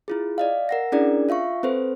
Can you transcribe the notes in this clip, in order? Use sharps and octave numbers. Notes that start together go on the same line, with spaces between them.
E4 F4 G#4
D5 D#5 F5
A#4 F#5 A#6
C#4 D4 E4 G#4 A#4 D5
F4 E5 F5 C#6
C4 A4 B4 C5